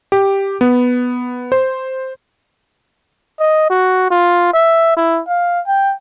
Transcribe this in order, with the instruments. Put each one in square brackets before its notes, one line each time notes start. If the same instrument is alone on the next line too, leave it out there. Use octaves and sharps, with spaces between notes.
[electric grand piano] G4
B3
C5
[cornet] D#5
F#4
F4
E5
E4
F5
G5